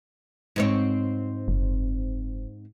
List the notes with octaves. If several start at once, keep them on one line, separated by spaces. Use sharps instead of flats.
G#2 C4 C#5
F#1